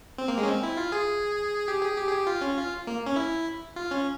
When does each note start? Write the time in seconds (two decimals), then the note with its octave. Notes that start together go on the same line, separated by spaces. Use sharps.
0.18 C4
0.28 A#3
0.38 G#3
0.43 C#4
0.47 C4
0.63 E4
0.77 F4
0.92 G#4
1.68 G4
1.82 G#4
1.98 G4
2.08 G#4
2.12 G4
2.27 F4
2.41 C#4
2.58 F4
2.87 A#3
3.07 C#4
3.16 E4
3.76 F4
3.91 C#4